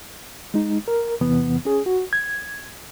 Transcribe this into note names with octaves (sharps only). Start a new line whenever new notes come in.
G#3 D#4
A#4
E2 C3 E3 B3
C#4 G#4
F#4
G#6